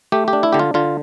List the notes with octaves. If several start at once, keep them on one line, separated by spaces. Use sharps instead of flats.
A3 G4
G4
D4
E4
D3 G4
F4
D3 F4